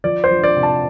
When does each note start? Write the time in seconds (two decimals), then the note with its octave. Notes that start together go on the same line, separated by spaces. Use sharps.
0.04 F3 D5
0.24 C5
0.30 F3
0.44 D5
0.56 C3
0.63 A5